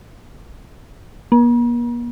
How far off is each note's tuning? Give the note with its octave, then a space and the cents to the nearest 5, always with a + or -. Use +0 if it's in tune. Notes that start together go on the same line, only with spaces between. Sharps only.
A#3 +45